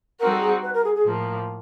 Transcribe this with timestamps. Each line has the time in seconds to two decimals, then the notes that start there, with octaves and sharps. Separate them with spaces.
0.19 G3 C4 D#4 F#4 A#4
0.30 A4
0.41 G#4
0.62 B4
0.73 A#4
0.84 G#4
0.94 G#4
1.04 A2 F3 A#3